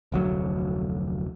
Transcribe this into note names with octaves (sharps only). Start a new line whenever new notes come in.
F1 D2 F#3